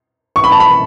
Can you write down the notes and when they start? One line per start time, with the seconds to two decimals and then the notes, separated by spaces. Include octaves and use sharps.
0.36 C#6
0.44 B5
0.52 A5
0.60 B5